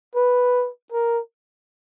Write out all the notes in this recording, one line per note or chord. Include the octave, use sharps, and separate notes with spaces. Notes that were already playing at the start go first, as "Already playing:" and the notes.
B4
A#4